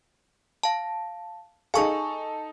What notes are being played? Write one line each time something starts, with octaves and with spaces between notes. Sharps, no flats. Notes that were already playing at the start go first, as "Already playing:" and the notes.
F5 A5
D#4 G#4 A4 F5 G#5 C#6